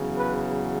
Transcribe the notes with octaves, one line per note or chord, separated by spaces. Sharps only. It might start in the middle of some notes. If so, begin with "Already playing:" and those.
Already playing: E2 C#3 F#3
B4